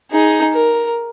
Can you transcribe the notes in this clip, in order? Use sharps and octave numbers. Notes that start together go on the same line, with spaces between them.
D#4 G#4
A#4